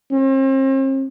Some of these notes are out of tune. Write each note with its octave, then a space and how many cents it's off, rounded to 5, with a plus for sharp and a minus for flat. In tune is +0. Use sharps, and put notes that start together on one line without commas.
C4 +45